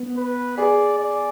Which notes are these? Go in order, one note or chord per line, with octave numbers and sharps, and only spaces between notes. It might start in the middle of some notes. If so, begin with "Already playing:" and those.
Already playing: B3
B4
G#4 D5
D5